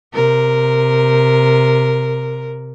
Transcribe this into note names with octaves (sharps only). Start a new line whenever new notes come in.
C3 A#4